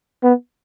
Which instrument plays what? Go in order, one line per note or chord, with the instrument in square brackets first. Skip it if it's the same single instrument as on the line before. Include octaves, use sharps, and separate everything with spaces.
[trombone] B3